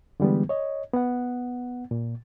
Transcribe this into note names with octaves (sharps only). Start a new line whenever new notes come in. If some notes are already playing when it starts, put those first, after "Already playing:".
D3 E3 G3 G#3 B3
C#5 D#5
B3 F#5
A#2